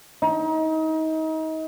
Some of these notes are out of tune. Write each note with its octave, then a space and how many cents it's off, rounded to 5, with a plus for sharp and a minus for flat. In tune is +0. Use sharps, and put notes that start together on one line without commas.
D#4 +30